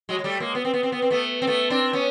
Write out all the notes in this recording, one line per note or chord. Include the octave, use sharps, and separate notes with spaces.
F#3 G#3
G#3
G3 A3
G#3 A#3
B3
C4
B3
C4
B3
C4
A3 B3
C4
A3 B3
C4 D4
B3 C#4